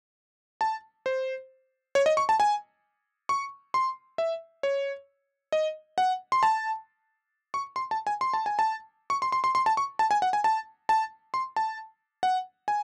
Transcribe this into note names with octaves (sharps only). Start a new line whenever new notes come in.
A5
C5
C#5
D#5
C#6
A5
G#5
C#6
C6
E5
C#5
D#5
F#5
C6
A5
C#6
C6
A5
G#5
C6
A5
G#5
A5
C#6
C6
C6
C6
C6
A5
C#6
A5
G#5
F#5
G#5
A5
A5
C6
A5
F#5
G#5